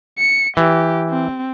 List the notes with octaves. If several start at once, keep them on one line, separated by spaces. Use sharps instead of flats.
C#7
E3 G4
C4